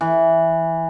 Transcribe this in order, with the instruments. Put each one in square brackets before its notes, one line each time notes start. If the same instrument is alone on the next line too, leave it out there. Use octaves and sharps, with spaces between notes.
[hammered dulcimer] E3